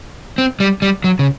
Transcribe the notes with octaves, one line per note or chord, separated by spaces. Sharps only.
C4
G3
G3
F#3
C#3